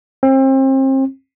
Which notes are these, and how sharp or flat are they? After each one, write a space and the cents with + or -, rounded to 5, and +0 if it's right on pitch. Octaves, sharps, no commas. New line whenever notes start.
C4 +35